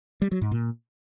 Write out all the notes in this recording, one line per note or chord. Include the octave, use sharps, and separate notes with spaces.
G3
F#3
G#2
A#2